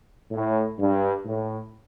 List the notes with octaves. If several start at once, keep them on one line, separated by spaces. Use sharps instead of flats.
A2
G2
A2